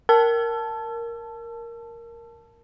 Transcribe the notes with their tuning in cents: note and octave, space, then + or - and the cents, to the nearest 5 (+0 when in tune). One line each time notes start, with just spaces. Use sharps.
A#4 +0 A5 +0 E6 +35